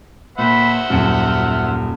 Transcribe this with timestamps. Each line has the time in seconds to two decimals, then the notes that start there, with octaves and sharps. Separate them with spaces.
0.38 A#2 C5 E5 F#5 B5
0.90 D#1 F#2 F6 C#7